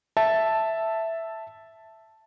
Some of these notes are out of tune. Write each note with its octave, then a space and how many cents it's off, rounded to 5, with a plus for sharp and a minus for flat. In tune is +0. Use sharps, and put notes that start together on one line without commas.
E5 +0 A5 +0